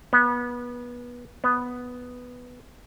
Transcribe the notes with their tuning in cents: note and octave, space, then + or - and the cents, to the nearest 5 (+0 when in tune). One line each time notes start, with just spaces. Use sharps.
B3 -25
B3 +0